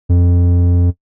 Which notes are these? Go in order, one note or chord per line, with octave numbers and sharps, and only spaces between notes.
F2